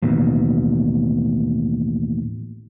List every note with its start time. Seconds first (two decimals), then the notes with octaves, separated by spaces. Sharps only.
0.02 A1 D#2 B2